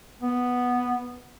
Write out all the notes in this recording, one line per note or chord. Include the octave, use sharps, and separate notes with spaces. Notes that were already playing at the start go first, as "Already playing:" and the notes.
B3